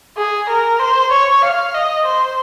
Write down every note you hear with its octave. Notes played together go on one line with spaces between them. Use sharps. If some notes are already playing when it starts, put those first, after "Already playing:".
G#4
A#4
C5
C#5
F5
D#5
C5